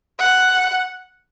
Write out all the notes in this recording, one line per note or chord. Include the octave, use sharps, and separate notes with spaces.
F#5